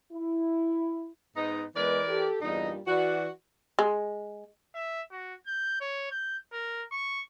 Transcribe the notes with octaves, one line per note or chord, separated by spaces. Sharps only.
E4
G#2 B3 D#4
E3 G#3 B3 A#4 B4 D5
G4 A4
E2 G2 A#2 G3 D#4
E3 F#4 D5
G#3
E5
F#4
G6
C#5
G6
A#4
C#6